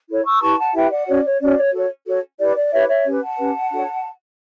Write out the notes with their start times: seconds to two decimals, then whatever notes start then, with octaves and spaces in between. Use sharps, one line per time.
0.08 E4 A4 C#5
0.25 C#6 E6
0.41 E4 G4 B4 A5 C#6
0.58 F#5 A5
0.74 E4 G4 B4 E5 G5
0.91 D5 F#5
1.07 C#4 F#4 C#5 D5
1.24 C#5
1.41 C#4 F#4 C#5 D5
1.57 C#5
1.73 F#4 A4 C#5
2.06 F#4 A4 C#5
2.39 E4 G4 B4 D5
2.55 D5
2.72 E4 G4 B4 C#5 E5
2.88 C#5 E5
3.05 C#4 G4 B4
3.21 F#5 A5
3.38 C#4 G4 B4
3.70 D4 F#4 A4 C#5